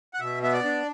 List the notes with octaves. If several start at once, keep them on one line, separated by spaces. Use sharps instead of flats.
F#5
B2 E5
B3 E5
D5
D4